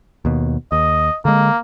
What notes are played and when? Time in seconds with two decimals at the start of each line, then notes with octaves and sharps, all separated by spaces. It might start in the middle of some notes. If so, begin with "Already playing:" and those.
0.25 D#2 B2
0.72 D#2 D#5
1.25 D3 G#3 A#3